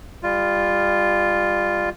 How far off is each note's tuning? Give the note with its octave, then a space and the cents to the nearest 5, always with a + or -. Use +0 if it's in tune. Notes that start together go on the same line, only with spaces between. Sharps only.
G3 +30 F4 +0